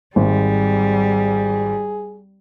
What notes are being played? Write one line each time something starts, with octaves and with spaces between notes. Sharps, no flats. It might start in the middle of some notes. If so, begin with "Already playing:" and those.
G#1 G3 G#4